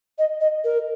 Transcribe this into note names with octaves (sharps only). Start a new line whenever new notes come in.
D#5
D#5
A#4